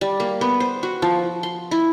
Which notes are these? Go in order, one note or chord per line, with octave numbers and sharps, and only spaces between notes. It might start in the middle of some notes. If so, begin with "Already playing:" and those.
G3
A#3
B3
C5
F#4
F3
C6
E4